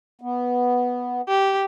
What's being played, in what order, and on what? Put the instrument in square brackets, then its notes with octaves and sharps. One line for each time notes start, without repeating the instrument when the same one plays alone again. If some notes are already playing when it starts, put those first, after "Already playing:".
[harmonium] B3
[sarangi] G4